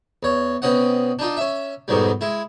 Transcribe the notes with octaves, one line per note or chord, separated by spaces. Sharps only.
E2 C#5
B2 C4 C#4 D#5 F#5
D4 D#4 F4
C#4 E5
F2 G#2 B2 D#3 F#3 G3
G#3 E4